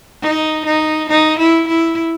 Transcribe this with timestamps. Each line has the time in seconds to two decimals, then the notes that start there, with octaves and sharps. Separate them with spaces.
0.22 D#4
0.66 D#4
1.10 D#4
1.39 E4
1.68 E4